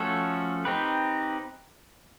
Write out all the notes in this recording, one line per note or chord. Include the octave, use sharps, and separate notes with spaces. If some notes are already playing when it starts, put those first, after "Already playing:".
Already playing: F3 A3 C#4 F#4 A4
C4 D#4 G4 B4